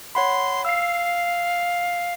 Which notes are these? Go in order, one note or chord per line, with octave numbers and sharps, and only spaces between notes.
C#5 F#5 B5 C6
F5 E6 C7